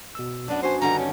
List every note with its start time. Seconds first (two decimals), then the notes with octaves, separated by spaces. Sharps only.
0.15 B2 E6
0.48 F#2 B3 D4
0.63 D4 F#4 C5 G#5
0.82 G2 D3 D#3 A#5
0.99 C#4